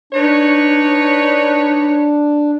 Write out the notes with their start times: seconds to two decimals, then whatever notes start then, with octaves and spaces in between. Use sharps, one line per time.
0.13 D4 D#4 B4 C#5